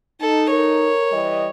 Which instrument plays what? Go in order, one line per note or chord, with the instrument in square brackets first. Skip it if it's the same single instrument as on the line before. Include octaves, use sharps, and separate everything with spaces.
[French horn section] D#4 [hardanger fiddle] A4
[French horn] A#4 [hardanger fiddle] C#5
[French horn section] E3 G3 D#5